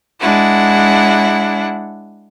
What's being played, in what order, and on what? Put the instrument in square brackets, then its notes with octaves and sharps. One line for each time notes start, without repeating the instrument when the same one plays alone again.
[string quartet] G#3 D4 E4 F#5